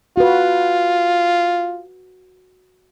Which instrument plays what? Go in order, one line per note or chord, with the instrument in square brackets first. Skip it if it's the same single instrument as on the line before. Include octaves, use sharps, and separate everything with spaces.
[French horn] F4 [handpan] F#4 B4